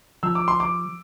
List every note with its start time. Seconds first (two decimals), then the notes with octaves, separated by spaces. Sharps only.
0.23 F3 E6
0.35 D6
0.48 C6
0.60 D6